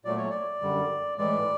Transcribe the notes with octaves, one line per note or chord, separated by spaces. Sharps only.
A#2 F#3 A3 D5
C#5
D5
F#2 D3 G3
A2 E3 G#3 D5